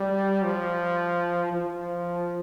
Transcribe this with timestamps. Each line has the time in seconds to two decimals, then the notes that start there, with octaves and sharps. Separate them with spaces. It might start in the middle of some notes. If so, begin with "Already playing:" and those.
Already playing: G3
0.44 F3
1.53 F3